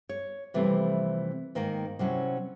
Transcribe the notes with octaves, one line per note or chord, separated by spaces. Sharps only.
C#5
C3 E3 F3 G3 A3 C4
G#2 D#3 A#3 D#4 D#5 G5
C3 F#3 C#4 E4